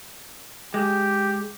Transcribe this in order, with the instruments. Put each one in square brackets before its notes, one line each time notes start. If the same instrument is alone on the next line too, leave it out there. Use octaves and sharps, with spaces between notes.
[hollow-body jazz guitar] G#3 [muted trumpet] G4